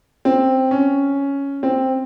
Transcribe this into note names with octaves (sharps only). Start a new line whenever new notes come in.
C4
C#4
C4